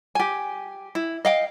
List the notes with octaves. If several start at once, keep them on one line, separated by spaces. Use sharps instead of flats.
G4 G#5
E4
D#5 F5 G5